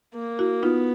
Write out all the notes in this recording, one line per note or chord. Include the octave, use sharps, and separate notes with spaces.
A#3
E4 F#4
B3 D#4 F4